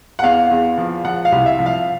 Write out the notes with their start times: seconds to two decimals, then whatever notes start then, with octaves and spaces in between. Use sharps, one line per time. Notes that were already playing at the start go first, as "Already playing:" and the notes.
0.19 F#5
0.23 E2 F5
0.50 E2
0.78 F3
1.05 F3 F#5
1.25 F5
1.32 C2
1.46 E5
1.59 F3
1.66 F5